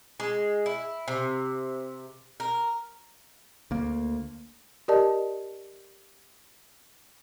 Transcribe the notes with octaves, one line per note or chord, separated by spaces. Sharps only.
G#3
E4
C3
A#4
D2 A#3
G4 A#4 D5 D#5 A5